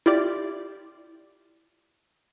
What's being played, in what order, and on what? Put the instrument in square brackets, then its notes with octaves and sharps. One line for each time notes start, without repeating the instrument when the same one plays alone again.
[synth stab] E4 F4 G4 D5